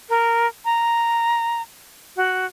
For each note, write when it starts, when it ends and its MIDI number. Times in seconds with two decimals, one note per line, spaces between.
0.09 0.47 70
0.65 1.62 82
2.16 2.45 66